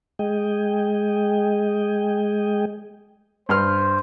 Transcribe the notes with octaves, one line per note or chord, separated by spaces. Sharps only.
G#3 G#4 D#5 G5
G2 C5 C6 F6